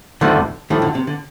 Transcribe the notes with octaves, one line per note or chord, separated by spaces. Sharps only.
D2 D3 D#3 G3 A3 C4 F4
A2 D#3 F3 G3 A3
D3
C3
D3